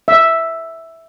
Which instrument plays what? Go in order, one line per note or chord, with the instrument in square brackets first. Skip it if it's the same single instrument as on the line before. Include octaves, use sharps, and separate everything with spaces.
[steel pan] E5